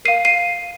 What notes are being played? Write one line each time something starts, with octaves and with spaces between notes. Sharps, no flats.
A#4 F5 C7 D#7
C7 D#7